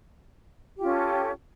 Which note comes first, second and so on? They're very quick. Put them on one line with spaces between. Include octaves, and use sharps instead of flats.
G4 F4 C#4 A4